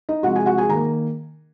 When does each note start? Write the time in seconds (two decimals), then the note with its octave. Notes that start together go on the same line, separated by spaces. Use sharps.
0.09 D#4 D#5
0.23 C3 F3 G#3 F#4 F#5
0.35 G#4 G#5
0.46 F#4 F#5
0.57 G#4 G#5
0.69 D#3 A#3 A#5